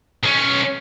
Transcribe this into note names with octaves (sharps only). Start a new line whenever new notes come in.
B1 C#4